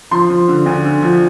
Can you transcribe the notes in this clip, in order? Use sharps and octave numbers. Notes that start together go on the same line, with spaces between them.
F3 C6
F3
D3
D2
D3
F3